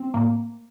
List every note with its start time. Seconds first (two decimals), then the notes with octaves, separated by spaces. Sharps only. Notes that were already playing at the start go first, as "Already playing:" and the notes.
Already playing: C4
0.14 A2 A#3